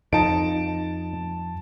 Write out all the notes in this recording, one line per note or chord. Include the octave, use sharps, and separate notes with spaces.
F2 F3 D#4 A5 D7